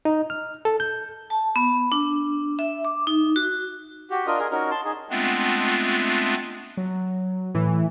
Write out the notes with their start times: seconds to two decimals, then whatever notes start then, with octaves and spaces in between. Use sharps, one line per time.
0.05 D#4
0.30 F6
0.65 A4
0.80 G6
1.30 A5
1.56 B3
1.92 D4
2.59 E5
2.85 D6
3.07 D#4
3.36 F#4
4.11 F#4 G4
4.27 D4 F4 A#4 D#5
4.39 G#4 A#4
4.51 C#4 D#4 F#4 A#4
4.71 A5 C6
4.85 D#4 G#4
5.10 G#3 A3 B3 C4 D4 F4
6.77 F#3
7.55 A2 E3